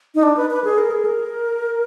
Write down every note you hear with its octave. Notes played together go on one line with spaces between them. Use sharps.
D#4
D4
B4
B4
G#4
A#4
G#4
A#4